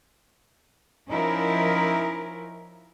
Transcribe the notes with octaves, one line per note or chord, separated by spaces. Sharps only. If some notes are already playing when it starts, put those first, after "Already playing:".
F3 C#4 D#4 E4 A#4